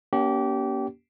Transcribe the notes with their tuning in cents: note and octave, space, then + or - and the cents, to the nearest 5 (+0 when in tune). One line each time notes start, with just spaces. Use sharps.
A#3 +35 C#4 +35 G4 -25